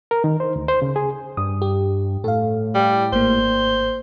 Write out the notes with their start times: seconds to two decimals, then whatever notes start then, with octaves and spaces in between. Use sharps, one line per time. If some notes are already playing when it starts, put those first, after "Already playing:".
0.11 A#4
0.24 D#3
0.40 C5
0.56 D2
0.68 C5
0.82 C#3
0.96 G#4
1.37 G2 D#6
1.62 G4
2.24 A2 A4 F5
2.74 G3
3.12 G#1 A#3 C5